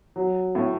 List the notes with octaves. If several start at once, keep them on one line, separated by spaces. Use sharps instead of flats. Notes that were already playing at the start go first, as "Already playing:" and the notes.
F#3
A2